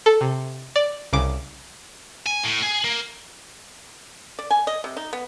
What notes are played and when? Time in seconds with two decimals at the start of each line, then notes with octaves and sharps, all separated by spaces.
0.06 A4
0.21 C3
0.76 D5
1.13 C2 C#3 D6
2.26 G#5
2.44 A2
2.62 G#4
2.84 A#3
4.39 D5
4.50 G#5
4.67 D#5
4.84 C3
4.97 D#4
5.13 B3